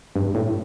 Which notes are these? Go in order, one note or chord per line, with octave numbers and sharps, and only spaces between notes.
G2
A2